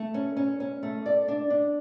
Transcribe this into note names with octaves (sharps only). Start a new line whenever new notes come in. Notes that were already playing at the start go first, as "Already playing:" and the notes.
Already playing: A3
C#4
C#4
C#4
A3
D5
D4
D4